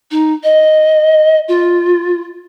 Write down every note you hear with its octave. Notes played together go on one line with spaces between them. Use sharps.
D#4
D#5
F4